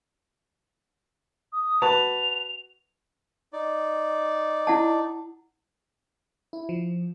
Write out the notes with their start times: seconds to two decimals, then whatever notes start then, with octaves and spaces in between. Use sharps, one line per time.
1.53 D#6
1.82 F#4 B4 A5 F7
3.53 D#4 D5
4.67 E4 F#5 A5
6.53 E4
6.69 F3